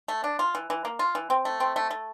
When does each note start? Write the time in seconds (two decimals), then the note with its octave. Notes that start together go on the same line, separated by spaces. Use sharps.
0.08 A3
0.24 D4
0.39 F4
0.55 E3
0.70 E3
0.85 A#3
0.99 F4
1.15 E3
1.30 C4
1.45 A3
1.60 C4
1.76 A3
1.91 A3